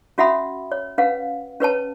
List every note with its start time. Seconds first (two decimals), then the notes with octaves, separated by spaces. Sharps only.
0.18 C#4 F#4 E5 F#5 B5 D#6
0.72 C#5
0.98 C#4 B4 F5 F#5
1.60 C#4 B4 C#5 A5